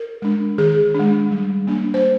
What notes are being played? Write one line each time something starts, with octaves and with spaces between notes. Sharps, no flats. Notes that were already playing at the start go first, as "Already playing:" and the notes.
Already playing: A#4
G#3 D4
D#3 G#4
G#3 D4
G3
A#3 D4
C5